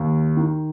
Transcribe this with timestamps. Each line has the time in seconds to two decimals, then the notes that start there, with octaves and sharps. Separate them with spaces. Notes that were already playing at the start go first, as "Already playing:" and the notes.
Already playing: D#2
0.37 D#3